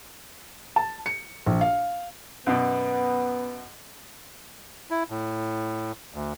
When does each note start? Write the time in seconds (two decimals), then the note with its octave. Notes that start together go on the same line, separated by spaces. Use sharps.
0.76 A5
1.06 C#7
1.46 A#1
1.61 F5
2.47 F#2 B2 B3
4.91 E4
5.10 A2
6.14 D2